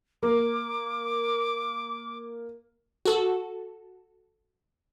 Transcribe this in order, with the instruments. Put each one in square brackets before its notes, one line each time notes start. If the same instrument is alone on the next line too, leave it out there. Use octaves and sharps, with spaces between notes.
[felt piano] A#3 [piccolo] D6
[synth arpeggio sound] F#4 A4